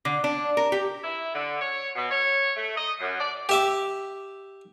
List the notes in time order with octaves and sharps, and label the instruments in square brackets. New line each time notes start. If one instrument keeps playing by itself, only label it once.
[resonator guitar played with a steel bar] D3
D4
A#4
G4
[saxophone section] E4
D3
C#5
B2
C#5
A3
D#5
F#2
D5
[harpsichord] G4 E5 D6